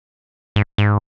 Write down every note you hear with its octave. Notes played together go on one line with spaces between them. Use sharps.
G#2
G#2